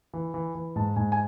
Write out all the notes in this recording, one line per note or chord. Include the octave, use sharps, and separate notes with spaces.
E3
E3
E3
G#2 A5
G#2 G#5
G#5